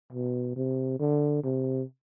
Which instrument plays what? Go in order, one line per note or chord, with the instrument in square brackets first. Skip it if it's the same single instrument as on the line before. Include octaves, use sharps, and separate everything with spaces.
[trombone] B2
C3
D3
C3